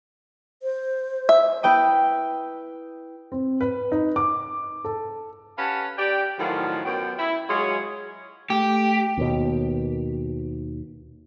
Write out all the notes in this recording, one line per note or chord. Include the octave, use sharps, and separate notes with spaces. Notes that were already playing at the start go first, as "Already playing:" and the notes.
C5
E5
E4 B4 G5 D#6
C4
B4
D#4
D6
A4
C#4 G4 B4 F5 F#5 A5
G4 D5 G5
A2 D#3 F3 F#3 F4 G#4
F#2 B2 F#3 G5
E4
F#3 G#3 F4 G#4 C#5
A3 G4
D#2 B2